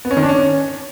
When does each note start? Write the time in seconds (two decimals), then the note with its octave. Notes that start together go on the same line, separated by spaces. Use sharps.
0.05 B3
0.11 C#4
0.17 D#3
0.23 D4
0.29 C#4